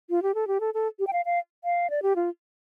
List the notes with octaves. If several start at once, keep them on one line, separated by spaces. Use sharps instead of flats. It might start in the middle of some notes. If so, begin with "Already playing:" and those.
F4
G4
A4
G4
A4
A4
G4
G5
F5
F5
F5
D5
G4
F4